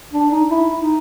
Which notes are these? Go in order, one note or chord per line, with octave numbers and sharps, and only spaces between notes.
D4
D#4
E4
D#4